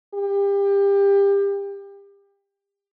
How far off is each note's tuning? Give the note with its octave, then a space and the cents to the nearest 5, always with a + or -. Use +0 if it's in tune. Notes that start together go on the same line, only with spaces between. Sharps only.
G4 +30